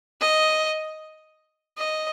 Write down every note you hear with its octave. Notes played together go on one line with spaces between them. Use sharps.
D#5
D#5